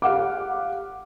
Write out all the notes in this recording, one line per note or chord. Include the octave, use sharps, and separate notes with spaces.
G4 F5 F#5 D6